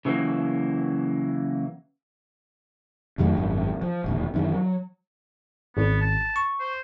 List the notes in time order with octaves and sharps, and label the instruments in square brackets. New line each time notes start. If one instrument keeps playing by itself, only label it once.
[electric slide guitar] C#3 E3 F#3 A#3
[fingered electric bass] F2 D#3 F#3 A3
G#1 F#2
F3
E1 A#1 D#2
F#2 D#3 E3
F#3
[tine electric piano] G#1 [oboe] B3
[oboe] A5
[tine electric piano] C#6
[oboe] C5